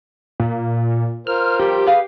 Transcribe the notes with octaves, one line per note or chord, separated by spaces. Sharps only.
A#2
F4 A#4 C5 F6
F2 G3 G4
G#4 B4 F5